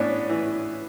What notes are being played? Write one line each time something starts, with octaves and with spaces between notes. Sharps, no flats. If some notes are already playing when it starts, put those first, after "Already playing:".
Already playing: A2 B3 C#4 D4
E3